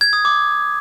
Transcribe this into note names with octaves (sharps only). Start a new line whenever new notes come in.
G#6
D#6
D6